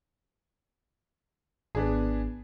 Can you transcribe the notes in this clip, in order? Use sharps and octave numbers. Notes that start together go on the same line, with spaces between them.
G#1 B3 D4 G#4